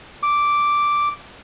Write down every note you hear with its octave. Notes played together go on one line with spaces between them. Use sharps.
D6